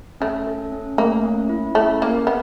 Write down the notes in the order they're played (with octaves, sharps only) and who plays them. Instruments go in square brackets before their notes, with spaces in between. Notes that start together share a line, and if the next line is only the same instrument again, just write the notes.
[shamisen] A3 [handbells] C#4
[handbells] A4
C#4
[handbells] A3 [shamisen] A#3
[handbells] C#4
E4
[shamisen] A3 [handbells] C#4
[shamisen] A#3 [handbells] A#4
[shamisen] B3